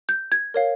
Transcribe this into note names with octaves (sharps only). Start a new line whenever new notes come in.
G6
G#6
A#4 C#5 F5